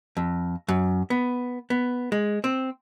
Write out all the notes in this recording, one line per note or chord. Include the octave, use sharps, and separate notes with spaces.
F2
F#2
B3
B3
G#3
C4